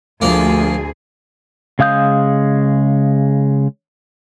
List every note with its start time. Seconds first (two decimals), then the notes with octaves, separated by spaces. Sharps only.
0.22 D2 F3 A#3 G#4
1.79 C#3 G#3 F5 D#6 G6